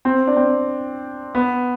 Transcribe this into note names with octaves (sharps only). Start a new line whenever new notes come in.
C4
D4
C4
B3